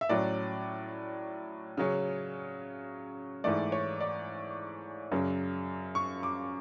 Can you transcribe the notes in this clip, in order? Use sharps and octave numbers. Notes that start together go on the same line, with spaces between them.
E5
A2 F#3 C#4 D5
C#3 F#3 C#4
G#2 E3 A3 D5
C#5
D5
F#2 C#3 F#3
C#6
D6